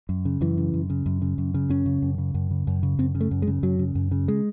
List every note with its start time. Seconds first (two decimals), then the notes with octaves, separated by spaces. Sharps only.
0.09 F#2
0.25 C#3
0.41 F#2 E3
0.57 C#3
0.74 F#2
0.90 C#3
1.06 F#2
1.22 C#3
1.38 F#2
1.54 C#3
1.69 F#2 C#4
1.86 C#3
2.02 F#2
2.18 C#3
2.34 F#2
2.51 C#3
2.67 F#2
2.83 C#3
2.98 F#2 C4
3.15 C#3
3.21 A3
3.31 F#2
3.42 G#3
3.47 C#3
3.63 F#2 F#3
3.79 C#3
3.95 F#2
4.11 C#3
4.28 G#3